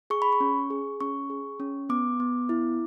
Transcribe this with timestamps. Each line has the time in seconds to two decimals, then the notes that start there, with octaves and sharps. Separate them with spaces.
0.10 G#4 C#6
0.22 B5
0.32 C#6
0.40 C#4
0.70 G#4
1.00 C#4 C#6
1.30 G#4
1.60 C#4
1.89 B3 D6
2.20 B3
2.49 E4